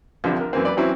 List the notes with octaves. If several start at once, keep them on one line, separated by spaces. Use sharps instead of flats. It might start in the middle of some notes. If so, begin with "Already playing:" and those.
C2 D3 F3 G3
A#4
F#2 E3 A#3 C4
B4 D5
E3 F#3 C4 C#4 E4